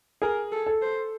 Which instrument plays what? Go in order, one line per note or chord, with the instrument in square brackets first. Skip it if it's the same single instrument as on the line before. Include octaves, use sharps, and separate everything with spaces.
[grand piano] G#4 [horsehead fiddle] A#4
[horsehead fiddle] A4
[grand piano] A4
[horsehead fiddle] C5